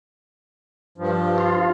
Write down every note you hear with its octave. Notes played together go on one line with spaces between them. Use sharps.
G2 F3
F4